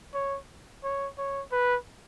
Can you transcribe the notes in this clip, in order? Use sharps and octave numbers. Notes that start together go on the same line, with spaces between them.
C#5
C#5
C#5
B4